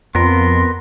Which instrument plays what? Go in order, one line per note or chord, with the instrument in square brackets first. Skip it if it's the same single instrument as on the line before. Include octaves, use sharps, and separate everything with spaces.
[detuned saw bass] F2 [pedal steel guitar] B3 A#4 [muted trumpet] C6